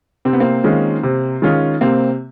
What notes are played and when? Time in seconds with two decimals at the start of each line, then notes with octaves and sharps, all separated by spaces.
0.25 C3 C4
0.33 B3
0.40 A#3 C4
0.64 D#3 G#3 C#4 F4
1.03 C3
1.42 D#3 G#3 C#4 F4
1.81 C3 A#3 C4